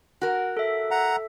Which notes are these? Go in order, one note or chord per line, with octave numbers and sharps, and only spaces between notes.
F#4 A#4
A4 E5
F#5 A#5